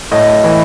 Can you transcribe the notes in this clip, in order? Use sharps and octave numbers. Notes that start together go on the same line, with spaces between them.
A2 D#5
E3